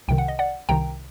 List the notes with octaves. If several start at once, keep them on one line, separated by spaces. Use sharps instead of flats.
C2 C3 D#3 G5
F#5
D#5
D5 F#5
C2 C3 D#3 G5 A#5